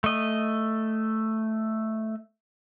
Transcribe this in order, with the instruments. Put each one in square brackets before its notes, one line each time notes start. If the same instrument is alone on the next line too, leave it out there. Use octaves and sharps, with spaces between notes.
[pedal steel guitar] A3 D#5